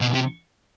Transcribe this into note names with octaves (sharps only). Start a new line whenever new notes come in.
B2
C3